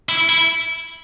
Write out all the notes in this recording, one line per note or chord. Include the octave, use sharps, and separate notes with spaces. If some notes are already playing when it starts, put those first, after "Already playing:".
E4
E4